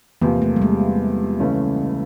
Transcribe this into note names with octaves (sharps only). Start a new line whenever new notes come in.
E2 C3 F3 A#3
A3
G3
G#3
C#2 C#3 E3 A3 C#4